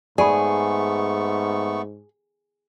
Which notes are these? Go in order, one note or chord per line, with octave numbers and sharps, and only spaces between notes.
G#2 A3 B3 G#4 D5 A5 B5 C#6